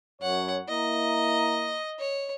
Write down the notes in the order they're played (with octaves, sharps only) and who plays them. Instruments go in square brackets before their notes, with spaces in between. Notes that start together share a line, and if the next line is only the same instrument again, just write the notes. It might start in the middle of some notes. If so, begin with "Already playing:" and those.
[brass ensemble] F#2 C#5 [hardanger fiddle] F#5
[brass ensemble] A#3 E4 A#5 [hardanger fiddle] D#5
[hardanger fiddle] C#5